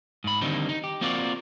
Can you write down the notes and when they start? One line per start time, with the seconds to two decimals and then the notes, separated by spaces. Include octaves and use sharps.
0.24 G#2 B5
0.41 D3 D#3 G3 A#3 C4 D#4
0.69 D#4
0.84 G4
1.01 A#3 C4 F4 F#4 A#4 D5